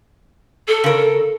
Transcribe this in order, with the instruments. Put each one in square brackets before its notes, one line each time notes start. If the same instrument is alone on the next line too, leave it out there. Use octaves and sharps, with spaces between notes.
[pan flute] A4
[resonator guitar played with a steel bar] C#3 A#4